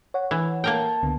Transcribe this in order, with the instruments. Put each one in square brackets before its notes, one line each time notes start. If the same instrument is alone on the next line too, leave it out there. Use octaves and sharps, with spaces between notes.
[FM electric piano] C#5 F#5
[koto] E3
[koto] A#3 A#4 G5 [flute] A5
[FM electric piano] C#2 D3 B3